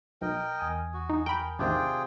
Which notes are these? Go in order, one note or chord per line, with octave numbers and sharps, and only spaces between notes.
B1 A#4 D#5 G5
E2 G#5 D#6
F#4
D#4
A#4 G5 B5
A1 C3 D#3 D4 F4 G#4 G5